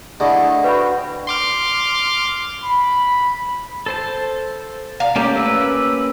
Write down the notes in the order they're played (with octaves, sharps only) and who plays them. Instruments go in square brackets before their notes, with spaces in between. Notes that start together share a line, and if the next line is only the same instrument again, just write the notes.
[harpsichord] D3 [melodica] A3 E4 D#5 [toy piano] G#4 A5
[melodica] F#4 G5 [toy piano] B4 F#5 B5
[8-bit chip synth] C6 D6 F6
[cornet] B5
[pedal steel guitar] A4 C5 A5
[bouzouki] F5 [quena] A#5
[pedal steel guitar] A3 A#3 C#4 [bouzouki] G4
[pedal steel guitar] A#3 C#4 B4 [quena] E6